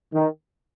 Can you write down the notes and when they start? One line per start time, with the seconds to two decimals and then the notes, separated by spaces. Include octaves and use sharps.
0.13 D#3